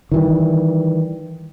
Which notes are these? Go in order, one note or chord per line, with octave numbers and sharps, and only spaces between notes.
D#3 E3 G3